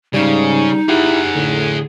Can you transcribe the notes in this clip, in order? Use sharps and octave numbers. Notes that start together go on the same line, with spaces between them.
G#2 C#3 G3 D#4
E4 G4 G#4 F#5
A2 D3